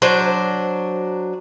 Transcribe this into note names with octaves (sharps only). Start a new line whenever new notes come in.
F#3 D4 C5